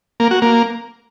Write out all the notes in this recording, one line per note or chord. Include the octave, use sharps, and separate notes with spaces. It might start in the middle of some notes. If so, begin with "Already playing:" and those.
A#3
F#4
A#3